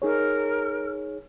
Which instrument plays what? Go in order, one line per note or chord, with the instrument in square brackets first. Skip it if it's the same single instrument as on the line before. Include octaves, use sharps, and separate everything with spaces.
[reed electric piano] D#4 G#4 C#5 [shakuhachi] A#4